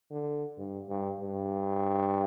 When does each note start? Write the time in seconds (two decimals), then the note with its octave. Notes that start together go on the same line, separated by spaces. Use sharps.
0.11 D3
0.58 G2
0.89 G2
1.21 G2